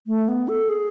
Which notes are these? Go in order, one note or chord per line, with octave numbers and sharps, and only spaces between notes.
A3
B3
A4
G#4